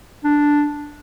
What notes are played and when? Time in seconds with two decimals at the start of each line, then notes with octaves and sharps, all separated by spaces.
0.24 D4